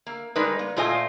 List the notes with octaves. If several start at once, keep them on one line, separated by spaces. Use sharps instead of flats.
A#3
G3 G#3 D#4 A#4 B4
A#3
A#2 A3 F4 C5 D#5 G#5